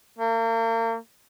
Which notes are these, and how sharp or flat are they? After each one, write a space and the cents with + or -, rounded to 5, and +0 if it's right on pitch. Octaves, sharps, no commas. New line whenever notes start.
A#3 -40